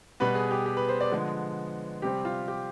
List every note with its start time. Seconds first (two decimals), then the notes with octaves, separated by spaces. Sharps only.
0.20 B2 G3 B3 B4
0.35 G#4
0.51 G4
0.66 G4
0.77 B4
0.89 C5
1.00 D5
1.11 D3 F3 G#3 B3
2.02 C3 G3 C4 G4
2.25 F4
2.48 G4